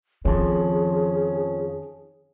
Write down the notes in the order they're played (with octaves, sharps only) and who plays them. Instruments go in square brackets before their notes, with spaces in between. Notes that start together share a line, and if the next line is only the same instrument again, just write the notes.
[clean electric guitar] F2 F3 [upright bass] D#3 [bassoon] C#4 [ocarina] G#4